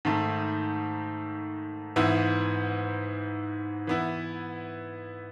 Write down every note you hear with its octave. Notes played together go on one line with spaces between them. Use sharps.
G#2 D#3 A3
G#2 E3 B3 E4
E3 B3 E4